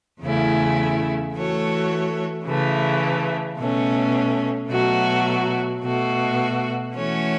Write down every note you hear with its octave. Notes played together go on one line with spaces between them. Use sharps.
E2 C#3 A3 C#4 E4
E3 A3 F#4 A4 C#5
C#3 E3 A3
B2 A3 C#4
B2 F#3 A3 F#4
B2 A3 F#4
E3 A3 C#4 F#4 C#5